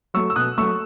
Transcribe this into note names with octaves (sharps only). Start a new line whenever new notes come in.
F#3 A3 C#6 E6
E6
B2 D#6 F#6
F#3 A3 C#6 E6